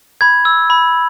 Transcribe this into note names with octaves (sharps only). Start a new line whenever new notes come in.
B5 G#6
E6
B5